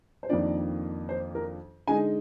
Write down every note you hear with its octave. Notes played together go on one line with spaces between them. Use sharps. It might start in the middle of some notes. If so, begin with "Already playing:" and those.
C5
F2 D#3 A#3 D4 F4 D5
C5
A#4
D3 G#3 D#4 G#5